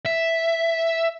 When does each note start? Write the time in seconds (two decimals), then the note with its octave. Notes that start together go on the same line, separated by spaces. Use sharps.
0.06 E5